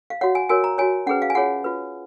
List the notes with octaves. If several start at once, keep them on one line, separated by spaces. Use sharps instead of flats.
F5
F#4 C#5 F#5
G#5
F#4 A#4 C#5 G#5
A#5
F#4 C#5 G#5
C#4 G#4 B4 F#5
F5
G#5
F4 G#4 C#5 F#5
F4 B4